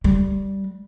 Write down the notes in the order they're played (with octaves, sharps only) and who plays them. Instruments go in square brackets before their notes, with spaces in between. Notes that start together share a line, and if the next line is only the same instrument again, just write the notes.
[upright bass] G3